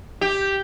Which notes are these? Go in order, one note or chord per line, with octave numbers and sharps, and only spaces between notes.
G4